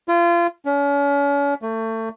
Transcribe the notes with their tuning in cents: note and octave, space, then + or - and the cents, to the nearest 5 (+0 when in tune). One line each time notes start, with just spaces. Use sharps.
F4 -30
C#4 +40
A3 +30